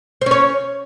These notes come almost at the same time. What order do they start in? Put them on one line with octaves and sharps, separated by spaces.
C5 C#4 C#5